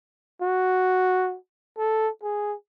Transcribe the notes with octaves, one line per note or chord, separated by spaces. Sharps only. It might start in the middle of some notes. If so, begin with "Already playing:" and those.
F#4
A4
G#4